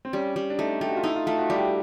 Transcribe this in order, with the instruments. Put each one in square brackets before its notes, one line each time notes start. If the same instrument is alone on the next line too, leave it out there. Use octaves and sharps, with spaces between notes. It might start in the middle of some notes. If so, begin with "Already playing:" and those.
[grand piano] C4
[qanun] G3 [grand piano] C#4
[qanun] G3
[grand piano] D4
[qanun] A3 [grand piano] D#4
[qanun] A3 [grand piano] G4
[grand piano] F#4
F4
[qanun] D#4 [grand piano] E4
[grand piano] F4
[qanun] A3 [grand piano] F4
[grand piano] F#4
[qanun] G3 [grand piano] G4